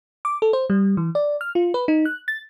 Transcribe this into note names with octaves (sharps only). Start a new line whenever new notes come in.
D6
A4
C5
G3
E3
D5
F6
F4
B4
D#4
F#6
A6